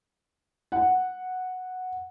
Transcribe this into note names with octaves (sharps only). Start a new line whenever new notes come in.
F#5